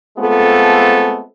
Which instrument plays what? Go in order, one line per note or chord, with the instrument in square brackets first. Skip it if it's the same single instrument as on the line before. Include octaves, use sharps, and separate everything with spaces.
[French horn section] G#3 A3 B3 C4 F4 A4